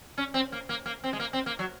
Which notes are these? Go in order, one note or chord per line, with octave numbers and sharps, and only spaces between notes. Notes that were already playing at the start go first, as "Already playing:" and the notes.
C#4
C4
A#3
A#3
A#3
C4
G#3
A#3
C4
A#3
F#3